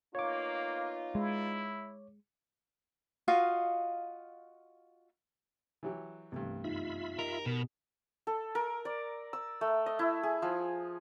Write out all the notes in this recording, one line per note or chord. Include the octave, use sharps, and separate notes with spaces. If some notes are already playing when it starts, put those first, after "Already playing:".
A#3 B3 D#4 F4 C#5 D6
G#3 E4
F4 F#4 D#5 F5
E3 F#3 G4
C2 G2 E3 A3 B3
F#2 D#4 F4 E5 B5
G4 A#4 D#5
B2 A#4 B5
A4
A#4
D5
E6
A3
D#5
E4
G#4
F3